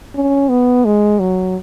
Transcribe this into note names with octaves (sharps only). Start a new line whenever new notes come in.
C#4
B3
G#3
F#3